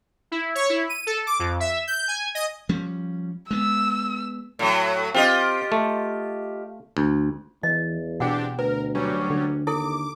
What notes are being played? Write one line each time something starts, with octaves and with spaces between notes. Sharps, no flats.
E4
C#5
E4
D#7
A4
D6
F2
E5
G6
G#5
D#5
F3 G3 C#4
G#3 B3 E6
A2 F#3
C4 F4 G4 D#5
A3
D2
E2 E3 D#5
B2 C4 D4 G4 F#5 G5
D2 A#4 B4
F#3 G3 C#4
D3
D#2 E4 A4 D6